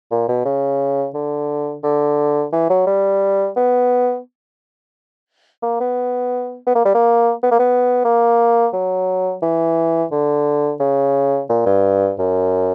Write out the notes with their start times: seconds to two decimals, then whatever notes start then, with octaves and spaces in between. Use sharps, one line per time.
0.11 A#2
0.28 B2
0.45 C#3
1.14 D3
1.83 D3
2.52 E3
2.70 F#3
2.87 G3
3.56 B3
5.63 A#3
5.80 B3
6.67 B3
6.75 A#3
6.85 G3
6.94 A#3
7.43 B3
7.51 A#3
7.59 B3
8.05 A#3
8.73 F#3
9.42 E3
10.12 D3
10.80 C#3
11.49 A#2
11.66 G2
12.19 F#2